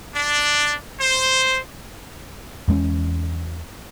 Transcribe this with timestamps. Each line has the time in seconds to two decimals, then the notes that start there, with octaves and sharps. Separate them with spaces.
0.14 D4
1.00 C5
2.68 E2 G#3 C#4